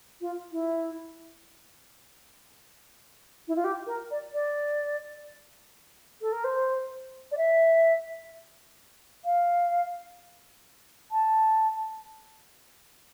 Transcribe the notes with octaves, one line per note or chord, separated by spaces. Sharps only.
F4
E4
E4
F4
G4
A#4
D5
D5
A4
A#4
C5
D5
E5
F5
A5